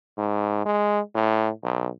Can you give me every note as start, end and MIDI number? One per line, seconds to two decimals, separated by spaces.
0.17 0.63 44
0.66 1.00 56
1.15 1.50 45
1.63 1.89 35